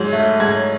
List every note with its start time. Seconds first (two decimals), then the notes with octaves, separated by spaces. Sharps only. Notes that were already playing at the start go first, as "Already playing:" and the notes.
Already playing: G#2 F#3
0.13 A3
0.40 G#2 G#6